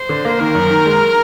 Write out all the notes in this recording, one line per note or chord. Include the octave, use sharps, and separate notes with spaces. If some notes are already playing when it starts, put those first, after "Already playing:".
Already playing: C5
D3
A#3
D#3 A#4
F#2
D#3
G#3